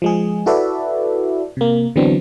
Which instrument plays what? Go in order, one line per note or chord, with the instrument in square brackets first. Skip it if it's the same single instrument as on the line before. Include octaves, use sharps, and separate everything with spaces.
[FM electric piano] F3 G#3 G#4
E4 F#4 A4 B4 D5 E5
C3 A#3
D3 E3 F#3 B3 C4 D4